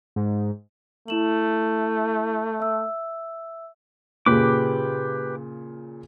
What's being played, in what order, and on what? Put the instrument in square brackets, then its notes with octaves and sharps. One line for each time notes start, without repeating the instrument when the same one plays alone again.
[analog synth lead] G#2
[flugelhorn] A3 [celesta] E4 E7 F#7
[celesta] E5 E6
[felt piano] A#2 C#3 [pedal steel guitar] G4 B4 D6